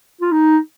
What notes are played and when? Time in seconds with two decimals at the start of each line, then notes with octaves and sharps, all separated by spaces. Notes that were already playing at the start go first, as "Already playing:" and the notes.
0.21 F4
0.31 D#4